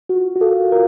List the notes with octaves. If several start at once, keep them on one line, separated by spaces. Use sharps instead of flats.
F4 F#4
F#4
A4 A#4 F5
F4 A#4